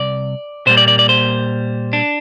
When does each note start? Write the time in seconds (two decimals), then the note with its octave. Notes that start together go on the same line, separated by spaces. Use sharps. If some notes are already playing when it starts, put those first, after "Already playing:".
Already playing: C2 C3 D5
0.67 A#2 G3 A#3 C5
0.77 D5
0.88 D5
0.99 D5
1.09 C5
1.93 D4